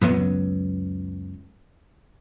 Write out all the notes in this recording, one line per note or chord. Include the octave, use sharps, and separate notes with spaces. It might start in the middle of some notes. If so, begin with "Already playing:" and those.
C#2 F#2 F#3 B3